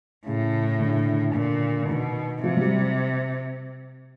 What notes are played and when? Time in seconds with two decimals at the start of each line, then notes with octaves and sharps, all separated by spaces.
0.26 A2 C#3
0.81 D3
0.88 C#3
0.95 D3
1.34 A#2 D3
1.81 D3
1.89 B2 D#3
2.43 C3 F3
2.57 F#3
2.61 G3